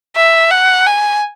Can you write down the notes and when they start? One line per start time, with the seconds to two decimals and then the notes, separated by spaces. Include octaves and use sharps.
0.16 E5
0.51 F#5
0.86 G#5